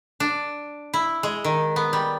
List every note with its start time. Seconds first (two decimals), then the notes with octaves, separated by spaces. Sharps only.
0.20 D4
0.94 E4
1.23 G#3
1.44 D#3
1.76 B3
1.93 G3